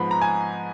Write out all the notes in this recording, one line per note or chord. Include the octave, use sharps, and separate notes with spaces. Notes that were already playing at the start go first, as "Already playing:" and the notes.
Already playing: G#2 F3 B3 B5
A#5
G#5